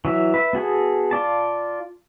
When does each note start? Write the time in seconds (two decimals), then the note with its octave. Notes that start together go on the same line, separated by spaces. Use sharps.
0.05 E3 F#3 E5
0.34 B4 E5
0.53 B3 F#4 G#4 A4
1.11 F4 D5 A5